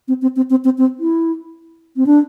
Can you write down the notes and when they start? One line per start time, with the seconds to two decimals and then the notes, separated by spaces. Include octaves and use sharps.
0.08 C4
0.22 C4
0.36 C4
0.50 C4
0.65 C4
0.78 C4
1.00 E4
1.97 C4
2.06 D4